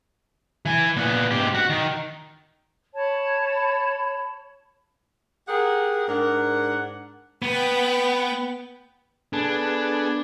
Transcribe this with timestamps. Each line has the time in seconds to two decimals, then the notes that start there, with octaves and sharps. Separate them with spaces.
0.66 E3 G#5
0.97 A#2 B3
1.31 G#2 G4
1.55 F#4 F#5
1.70 D#3
2.93 C#5 A5 B5
5.49 G4 G#4 A#4 F#5
6.08 G#2 D4 A#4 F#5
7.42 B3 B4 G5
9.33 B3 D4 G#4 A4